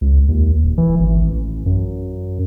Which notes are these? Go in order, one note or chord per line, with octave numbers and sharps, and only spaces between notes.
C#2
D#2
D#1
E3
G#1
A1
F#2